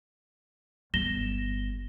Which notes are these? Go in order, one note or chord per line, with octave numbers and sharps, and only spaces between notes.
G1 A#6 E7 G7